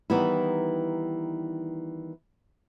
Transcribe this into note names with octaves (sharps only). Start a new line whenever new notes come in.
D#3 E3 G3 B3 D#4 E4